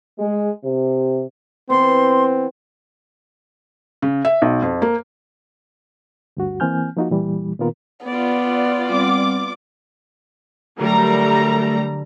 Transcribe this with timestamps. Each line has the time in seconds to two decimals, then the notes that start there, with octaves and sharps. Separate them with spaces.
0.19 G#3
0.64 C3
1.70 E3 B3 C4 C6
4.02 C#3
4.25 E5
4.42 B1
4.62 F2
4.82 A#3
6.37 D2 G2 F#4
6.60 E3 A#3 C4 G#5 F6 G6
6.97 F3 A#3 D#4 F4 F#4
7.10 A#2 E3 G3
7.59 A#2 D#3 B3 F4 A#4
8.06 B3 F4 D5
8.90 G3 C4 F#5 D6
10.79 D3 F#3 G3 A3 A4 A#4 A#5